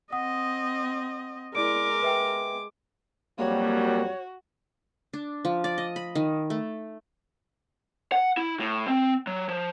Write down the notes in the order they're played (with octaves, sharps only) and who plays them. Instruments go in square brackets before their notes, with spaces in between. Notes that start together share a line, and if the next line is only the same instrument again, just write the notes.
[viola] C4 D#5 [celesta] F#5 D#6
[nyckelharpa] G#3 D6 [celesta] E4 D5 D7 [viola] A#4
[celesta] B4 E5 G5
[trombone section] F2 F#3 G3 [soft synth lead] A#3 [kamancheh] F#4 [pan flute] C#5
[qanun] D4
F3
D5
D#5
B5
D#3
A3
[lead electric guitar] F#5
E4
A2
C4
F#3
F3